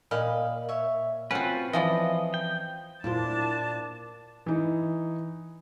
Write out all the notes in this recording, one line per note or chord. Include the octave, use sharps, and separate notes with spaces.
A#2 D#5 F5 B5
C#5 E5
C4 C#4 F4 F#4 B4 F#5
E3 F3 D5 D#5
G5
A#2 D4 E4 F4 C5 A5
E3 D#4